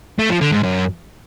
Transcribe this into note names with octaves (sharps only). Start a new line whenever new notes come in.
A3
F3
D3
G#2
F#2